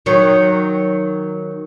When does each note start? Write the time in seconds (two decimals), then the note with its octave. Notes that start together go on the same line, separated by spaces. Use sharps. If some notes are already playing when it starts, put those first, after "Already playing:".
0.06 D#3 F#3